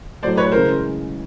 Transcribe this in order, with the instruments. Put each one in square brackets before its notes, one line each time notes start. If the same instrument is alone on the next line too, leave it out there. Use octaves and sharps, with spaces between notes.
[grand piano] A2 F#3 A3 [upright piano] C5 D5
[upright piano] B4 C#5
[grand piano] C#3 E3 G#3 [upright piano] A#4 C5